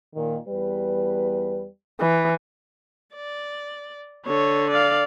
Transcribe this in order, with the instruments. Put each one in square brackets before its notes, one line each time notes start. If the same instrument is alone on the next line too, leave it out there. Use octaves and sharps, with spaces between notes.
[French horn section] A#2 D#3
E2 G3 B4
[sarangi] E3
[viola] D5
[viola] D3 [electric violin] C#5
[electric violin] D5 F5